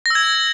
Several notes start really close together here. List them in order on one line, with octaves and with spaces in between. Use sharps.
A#6 E6 G#6